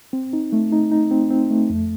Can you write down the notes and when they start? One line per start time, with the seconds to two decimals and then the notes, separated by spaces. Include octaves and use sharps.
0.13 C4
0.33 D#4
0.53 A3
0.72 D#4
0.92 D#4
1.11 C4
1.30 C4
1.50 A3
1.70 F2